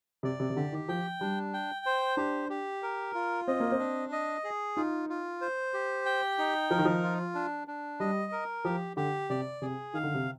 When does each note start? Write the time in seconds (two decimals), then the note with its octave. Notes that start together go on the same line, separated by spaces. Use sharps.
0.23 C3 D5
0.40 C3
0.50 C3
0.56 D3 G4
0.72 D#3
0.89 F3 G5
1.20 G3 D4
1.53 G5
1.86 C5
2.17 D4 G4
2.50 G4
2.83 A#4
3.14 F4
3.48 C4 D#5
3.60 A#3
3.72 C4
3.79 D4
4.12 D#5
4.44 G#4
4.77 D#4 F4
5.09 F4
5.41 C5
5.74 G4
6.05 G5
6.38 D#4
6.71 F3 A#4
6.78 D#3
6.85 F3
7.03 F4
7.35 D4
7.68 D4
8.00 G3 D#5
8.32 A#4
8.65 F3 G4
8.97 D3 G4
9.30 C3 D5
9.62 C3 G#4
9.94 D#3 F5
10.03 D3
10.14 C3